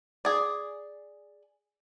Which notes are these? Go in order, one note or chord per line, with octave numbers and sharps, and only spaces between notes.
G#4 D5